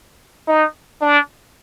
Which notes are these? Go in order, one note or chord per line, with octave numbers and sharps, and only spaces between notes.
D#4
D4